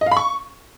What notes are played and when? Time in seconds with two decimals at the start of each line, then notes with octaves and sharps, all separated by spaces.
0.01 D#5
0.06 F5
0.11 B5
0.17 C#6